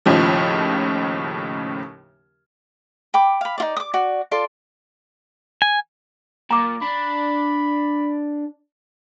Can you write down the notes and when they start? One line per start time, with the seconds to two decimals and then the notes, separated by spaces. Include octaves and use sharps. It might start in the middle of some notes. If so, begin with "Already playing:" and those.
0.06 D#2 A2 C#3 F3
3.14 G5 B5 D6
3.41 F5 B5
3.58 D#4 F4 D5
3.77 D6 D#6
3.94 F#4 D5
4.31 F4 A4 D5 C6
5.62 G#5
6.51 A#2 A#5 D6
6.82 D4 B5